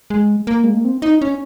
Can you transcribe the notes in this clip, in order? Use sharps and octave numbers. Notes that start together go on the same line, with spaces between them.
G#3
A#3
G#3
A#3
C4
D#4
C#4